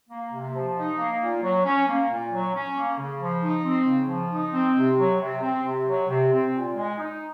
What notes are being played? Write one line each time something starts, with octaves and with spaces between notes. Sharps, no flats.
A#3
C3
F3
D#4
A#3
A#2
F#3
C#4
A#3
A#2
F#3
C#4
A#3
C#3
F3
D#4
C4
C#3
F3
D#4
C4
C3
F#3
C3
C4
C3
F#3
C3
C4
A#2
G#3
D#4